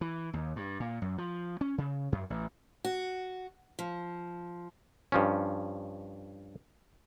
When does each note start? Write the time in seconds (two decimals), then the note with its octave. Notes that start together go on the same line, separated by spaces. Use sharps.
0.01 E3
0.33 D#2
0.56 G2
0.80 A#2
1.02 F#2
1.18 F3
1.61 C#4
1.78 C#3
2.12 F#2
2.30 A1
2.85 F#4
3.79 F3
5.12 G2 F3 C#4